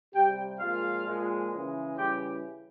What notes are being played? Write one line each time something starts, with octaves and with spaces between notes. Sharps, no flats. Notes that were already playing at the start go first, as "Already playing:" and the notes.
C3 G3 G4 G5
A#2 F3 G#3 F4 F5
A#2 F3 G#3
C#3 E3 G#3
C#3 E3 G3 G4 G5